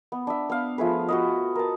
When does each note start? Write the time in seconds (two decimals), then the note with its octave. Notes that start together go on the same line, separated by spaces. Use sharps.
0.12 B3
0.27 D4 E5
0.50 B3 F5
0.78 F3 A3 G#4 B4
1.09 F#4 B4 D#5
1.55 A#4 A5